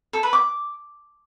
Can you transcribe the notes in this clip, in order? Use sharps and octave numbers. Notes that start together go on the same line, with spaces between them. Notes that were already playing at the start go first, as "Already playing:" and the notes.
A4
B4
D6